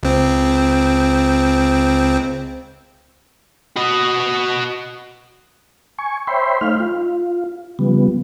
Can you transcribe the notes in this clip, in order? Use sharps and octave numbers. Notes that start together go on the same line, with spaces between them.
C#2 C4
F#4 D#5
G#5 C#6
C5 C#5 E5 G5 B5 C6
A3 D#4 F5 F6
F4
C#3 F3 G3 B3